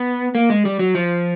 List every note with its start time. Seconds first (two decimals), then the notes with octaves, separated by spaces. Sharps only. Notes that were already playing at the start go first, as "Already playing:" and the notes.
Already playing: B3
0.35 A#3
0.50 G#3
0.65 G3
0.79 F#3
0.95 F3